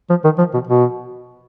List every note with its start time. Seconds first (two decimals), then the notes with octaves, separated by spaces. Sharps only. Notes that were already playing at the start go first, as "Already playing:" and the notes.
0.10 F3
0.24 D#3
0.38 F3
0.54 B2
0.67 B2